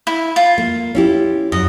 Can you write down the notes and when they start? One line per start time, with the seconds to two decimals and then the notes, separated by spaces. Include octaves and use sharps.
0.07 E4
0.36 F4
0.58 A#3
0.95 C#4 E4 G4
1.52 F#2 D#5